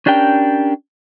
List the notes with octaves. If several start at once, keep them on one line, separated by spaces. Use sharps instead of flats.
C#4 D4 G4 A#4 G5